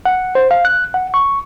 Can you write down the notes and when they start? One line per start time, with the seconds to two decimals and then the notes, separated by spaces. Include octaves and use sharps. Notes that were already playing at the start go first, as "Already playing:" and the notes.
0.05 F#5
0.35 C5
0.51 F5
0.65 F#6
0.94 F#5
1.14 C#6